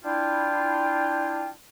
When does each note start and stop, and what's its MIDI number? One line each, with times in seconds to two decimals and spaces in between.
0.04 1.49 62
0.04 1.49 64
0.04 1.49 65
0.04 1.49 79